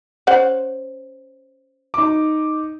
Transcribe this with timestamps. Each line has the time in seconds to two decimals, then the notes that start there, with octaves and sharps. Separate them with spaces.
0.27 C#4 C5 F#5
1.94 D#4 D6